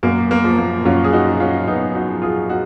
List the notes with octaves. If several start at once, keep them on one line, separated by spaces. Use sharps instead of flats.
F#2 A#3
A#3
F3
A#3
F#2 C#4 F4
G#4
D#4 F#4
F3
C#4 F4
F#2 B3 D#4
D#4 F#4
F3
F4 G#4
D#4 F#4